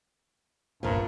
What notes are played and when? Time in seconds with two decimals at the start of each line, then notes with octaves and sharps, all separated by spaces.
0.83 G1 C2 G2 A#2 F3 B3 A#4